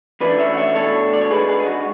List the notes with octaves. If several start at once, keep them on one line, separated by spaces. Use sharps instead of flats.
F#2 E3 A3 D4 B4 D5
C#5 E5
F#5
C#5 E5
B2 A3 D4 A4 C#5
D5
C#5
G#2 G#3 D4 G#4 B4
G#4 B4
G#4
F#4